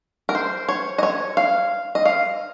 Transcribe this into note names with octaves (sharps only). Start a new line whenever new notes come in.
A#4
C5
C#5
D#5
C#5
F5
D#5
F5